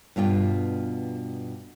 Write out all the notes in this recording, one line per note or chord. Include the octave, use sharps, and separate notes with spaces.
G2 B2 F4 G5